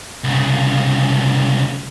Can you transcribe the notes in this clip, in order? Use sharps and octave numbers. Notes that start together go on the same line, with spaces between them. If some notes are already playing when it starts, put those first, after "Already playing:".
C2 C#3